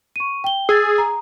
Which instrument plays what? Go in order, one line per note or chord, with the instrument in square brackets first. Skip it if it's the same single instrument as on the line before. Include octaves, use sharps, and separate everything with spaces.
[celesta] C#6 D#7
G5 G7
[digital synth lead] G#4 [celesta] E6 G#6 A6
[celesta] A#5